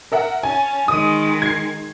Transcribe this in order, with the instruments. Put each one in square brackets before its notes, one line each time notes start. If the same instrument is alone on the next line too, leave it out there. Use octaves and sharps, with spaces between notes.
[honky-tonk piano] A#4 E5 F#5
[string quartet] C#4 A5 [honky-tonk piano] G#5
[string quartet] D#3 G#3 [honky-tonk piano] D#6 D#7
[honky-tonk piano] G#6 C7